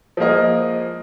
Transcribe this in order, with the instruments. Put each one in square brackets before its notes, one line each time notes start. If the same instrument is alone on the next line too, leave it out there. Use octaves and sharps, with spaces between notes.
[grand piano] F3 G#3 A#3 D#5